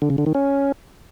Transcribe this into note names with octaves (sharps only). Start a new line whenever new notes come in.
D3
C#3
D3
D#3
C#4